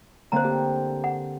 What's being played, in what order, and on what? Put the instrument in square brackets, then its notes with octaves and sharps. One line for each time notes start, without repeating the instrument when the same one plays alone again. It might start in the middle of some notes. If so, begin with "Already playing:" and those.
[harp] D3 A#3 C4 [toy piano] C5 A#5
[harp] G4
[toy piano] F#5